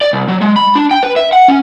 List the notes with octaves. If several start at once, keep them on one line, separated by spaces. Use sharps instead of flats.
D5
C2
F#3
G#3
B5
D4
G5
B4
E5
F#5
C#4